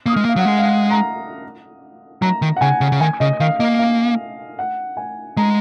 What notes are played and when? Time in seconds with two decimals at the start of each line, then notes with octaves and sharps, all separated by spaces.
0.06 A#3 D#6
0.13 F6
0.17 G#3
0.25 A#3
0.29 F5
0.36 F#3 F#5
0.46 G#3
0.58 F5
0.64 F#5
0.91 A#5
2.22 F#3 A#5
2.42 D#3
2.57 F#5
2.61 C#3 G#5
2.81 C#3
2.92 C#3
3.00 D#3 G#5
3.20 C#3 D#5
3.40 D#3 F5
3.59 A#3 D#5
3.79 F5
4.59 F#5
4.97 G#5
5.37 G#3 A#5